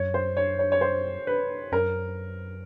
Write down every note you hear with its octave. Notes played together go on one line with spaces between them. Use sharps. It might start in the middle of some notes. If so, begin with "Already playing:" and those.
Already playing: F#2 C#5
C5
C#5
C#5
C#5
C5
B4
F#2 A#4